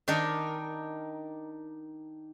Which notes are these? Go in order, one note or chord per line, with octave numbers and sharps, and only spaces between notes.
D#3 D4 D#4 A#4